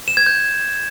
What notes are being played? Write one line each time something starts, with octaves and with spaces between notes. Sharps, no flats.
E7
G#6
G6